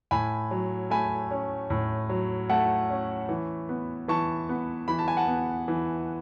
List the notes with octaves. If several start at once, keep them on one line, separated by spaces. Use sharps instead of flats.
A2 G#5 B5
F#3
A3 G#5 B5
C#4
A2
F#3
A3 F#5 A5
C#4
E3
B3
E3 A5 C#6
B3
E3 B5
A5
G#5
F#5 A5
B3
E3